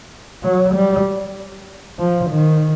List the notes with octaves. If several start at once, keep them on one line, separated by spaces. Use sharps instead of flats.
F#3
G3
F3
D#3